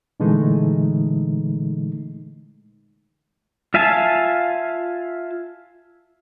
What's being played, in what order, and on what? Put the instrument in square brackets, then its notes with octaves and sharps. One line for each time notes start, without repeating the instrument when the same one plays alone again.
[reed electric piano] A#2 D3 E3 G#3 A3 D#4
[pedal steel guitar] F4 E5 F5 G#5 A5